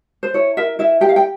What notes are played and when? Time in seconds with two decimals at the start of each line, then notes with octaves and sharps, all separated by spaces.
0.23 C5
0.34 E4 C#5
0.57 A#4 E5
0.79 E4 E5
1.01 G4 G5
1.09 F5
1.16 G5